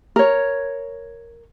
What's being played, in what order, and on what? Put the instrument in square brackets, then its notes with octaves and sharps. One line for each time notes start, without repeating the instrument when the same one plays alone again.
[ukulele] A#4 C#5